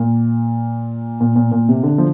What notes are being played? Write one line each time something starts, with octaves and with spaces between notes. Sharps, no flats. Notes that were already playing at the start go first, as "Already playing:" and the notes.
Already playing: A#2
A#2
A#2
A#2
C3
D3
F3